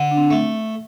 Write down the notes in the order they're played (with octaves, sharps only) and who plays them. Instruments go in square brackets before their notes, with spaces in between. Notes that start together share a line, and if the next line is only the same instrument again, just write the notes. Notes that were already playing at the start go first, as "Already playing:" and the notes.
Already playing: [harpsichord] D3
[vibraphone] D4
C4
[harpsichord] A3